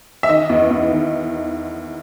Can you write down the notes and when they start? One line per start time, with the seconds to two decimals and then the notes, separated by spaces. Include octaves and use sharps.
0.23 E5
0.29 D#3 D#5
0.49 E2
0.70 E2
0.91 D#3